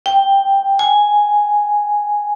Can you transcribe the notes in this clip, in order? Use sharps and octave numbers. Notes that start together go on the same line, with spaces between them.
G5
G#5